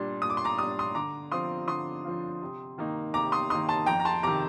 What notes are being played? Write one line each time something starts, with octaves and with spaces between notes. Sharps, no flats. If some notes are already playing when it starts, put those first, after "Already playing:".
Already playing: A#2 G3 D4 C6
A#2 D#6
D6
C6
A#5 D6
G3 D4 D#6
C6 D#6
D3 A#5 D6
F3 C4 F4 C6 D#6
D3 C6 D#6
F3 C4 F4
C3
D#3 A#3 D#4
C3 A#5 D6
C6 D#6
D#3 A#3 D#4 C6 D#6
A5 C6
F2 G5 A#5
A#5
A5 C6
C3 D#3 A#5 D6